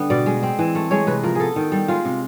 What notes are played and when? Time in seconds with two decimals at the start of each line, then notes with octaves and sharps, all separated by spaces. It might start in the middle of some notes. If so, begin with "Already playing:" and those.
Already playing: D3 G3 B3
0.10 B2 D5
0.26 G#3
0.43 C4
0.59 E3
0.75 A3
0.91 G#3 C#5
1.07 C3 B4
1.23 F3 A#4
1.35 B3 G#4 A4
1.56 D#3
1.72 G3
1.88 G#3 F4
2.05 C3